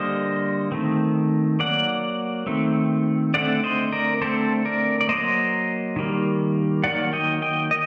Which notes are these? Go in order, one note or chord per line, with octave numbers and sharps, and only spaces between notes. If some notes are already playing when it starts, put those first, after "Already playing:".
Already playing: D3 G3 A#3 C5 D#5
D#3 A3 C4
F#3 A#3 D5 F#5
D#3 A3 C4
D3 A3 C4 D5 F#5
C5 D#5
A#4 D5
D3 A3 C4 A4 C5
A#4 D5
D5
F#3 A#3 C5 D#5
D#3 G3 A#3
D#3 F#3 A#3 D5 F#5
D#5 G5
D#5 G5
D#5